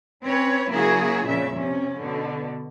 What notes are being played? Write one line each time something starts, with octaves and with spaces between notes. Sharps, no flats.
C4 C#4 B4 C#5
C#3 F#3 A#3 E4 F#4 G#4
F2 A#2 C#3 F3 C#4 E5
C3 C#4
B2 D3